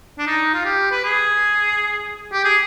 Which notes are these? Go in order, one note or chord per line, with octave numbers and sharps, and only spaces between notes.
D4
D#4
F4
G4
B4
G#4
G4
G#4